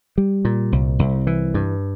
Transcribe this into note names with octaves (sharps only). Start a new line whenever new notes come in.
G3
A#2
C2
C2
E3
G2